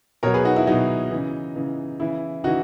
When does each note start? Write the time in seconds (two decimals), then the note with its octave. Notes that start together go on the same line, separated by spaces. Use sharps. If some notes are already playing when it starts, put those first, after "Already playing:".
0.23 B2 A#4 C#5
0.27 F#3
0.34 G#4 B4
0.45 D#4 F#4
0.56 E4
0.67 B2 F#3 D#4
1.11 C#3 E3
1.56 C#3 E3
2.00 C#3 E3 E4
2.44 C#3 E3 D#4 F#4